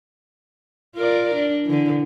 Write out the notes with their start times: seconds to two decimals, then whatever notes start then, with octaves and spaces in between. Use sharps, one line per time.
0.96 F4 A#4 D5
1.35 D4
1.65 D3 E3